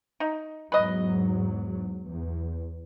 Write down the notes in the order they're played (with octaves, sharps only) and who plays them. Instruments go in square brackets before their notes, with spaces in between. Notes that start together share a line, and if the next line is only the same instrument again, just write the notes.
[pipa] D#4
[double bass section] E2 G#2 F#3 [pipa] B4 D#5
[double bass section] E2